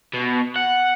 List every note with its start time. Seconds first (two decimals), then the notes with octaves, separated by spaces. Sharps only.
0.14 B2
0.56 F#5